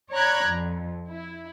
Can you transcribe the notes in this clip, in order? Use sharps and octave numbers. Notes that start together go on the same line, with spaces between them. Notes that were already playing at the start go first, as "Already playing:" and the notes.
C#5 D5 A#5 B5 F#6 G#6
F2
E4